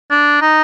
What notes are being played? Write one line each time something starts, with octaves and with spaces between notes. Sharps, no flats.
D4
D#4